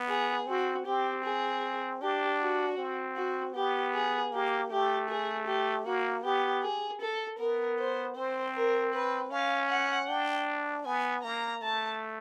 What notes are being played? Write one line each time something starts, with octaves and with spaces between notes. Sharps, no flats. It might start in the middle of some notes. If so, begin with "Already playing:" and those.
Already playing: B3
G#4
C4 F#4
C4 G4
G#4
D4 G4
F#4
C4
F#4
B3 G4
G#4
A#3 G4
A3 G4
G#4
G4
A#3 F#4
B3 G4
G#4
A4
B3 A#4
C5
C4 C5
A#4
B4
C#4 F5
F#5
D4 G5
B3 G#5
A#3 A#5
A3 A5